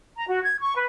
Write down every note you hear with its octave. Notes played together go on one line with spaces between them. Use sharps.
A#5
F#4
G#6
C#6
B4